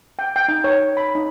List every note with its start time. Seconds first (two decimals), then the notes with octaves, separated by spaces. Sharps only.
0.19 G5
0.36 G5
0.48 D#4
0.64 C#5
0.97 B5
1.15 D#4